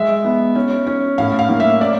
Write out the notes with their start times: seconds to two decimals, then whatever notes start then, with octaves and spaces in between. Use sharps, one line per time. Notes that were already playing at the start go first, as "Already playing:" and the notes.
Already playing: G#3 E5
0.25 B3
0.55 C#4
0.87 C#4
1.18 A2 F5
1.39 F5
1.49 A#3
1.60 E5
1.80 C#4 D5